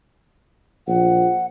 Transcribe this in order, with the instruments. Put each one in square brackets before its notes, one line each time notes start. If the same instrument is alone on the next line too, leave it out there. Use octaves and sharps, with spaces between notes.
[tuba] A#1 [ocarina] F#5